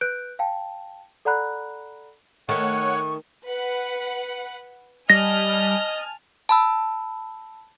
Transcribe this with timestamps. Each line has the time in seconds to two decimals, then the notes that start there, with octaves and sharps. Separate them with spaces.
0.01 B4 F#6 G6 D7
0.39 F5 G5 A5
1.25 A4 D5 F#5 A#5 B5 F#6
2.49 D#3 A3 C#5 F#5 C#6
3.48 B4 F#5
5.10 G3 D#5 G#5 A5 F6 A#6
6.49 A5 B5 E6